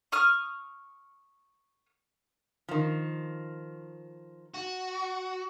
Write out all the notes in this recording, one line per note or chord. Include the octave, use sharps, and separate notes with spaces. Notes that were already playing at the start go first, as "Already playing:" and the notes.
C#6 D#6 F6
D#3 F3
F#4